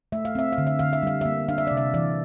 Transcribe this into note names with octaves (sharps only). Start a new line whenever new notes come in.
A3 E5
F5
C4 E5
F5
D3
E5
D3 F5
E5
G3 F5
A#3 E5
D4 F5
E5
C3 D5
E5
E3 D5